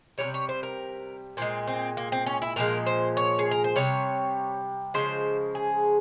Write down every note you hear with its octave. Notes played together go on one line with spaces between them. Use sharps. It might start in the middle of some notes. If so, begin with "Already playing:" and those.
E3 G3 C#5
C3
C#5
C5
A#4
A#2 G#3 C4
C4
A#3
C4
C#4
E4
A#2 F3 G#3 A#4
C5
C#5
G#4
A#4
C5
C3 G3 C#5
C#3 F3 G#3 C5
G#4